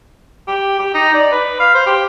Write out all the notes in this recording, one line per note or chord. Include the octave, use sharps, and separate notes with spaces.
G4
G4
D#4
D5
B4
F5
C5
G4